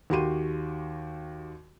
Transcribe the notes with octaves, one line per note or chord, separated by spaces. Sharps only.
D#2 F#4 G4 C6 D#7